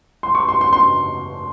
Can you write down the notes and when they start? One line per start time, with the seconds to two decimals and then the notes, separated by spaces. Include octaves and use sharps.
0.23 C6
0.35 C#6
0.48 C6
0.61 C6
0.73 C6